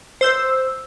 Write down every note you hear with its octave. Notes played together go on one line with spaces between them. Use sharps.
C5 E6 G6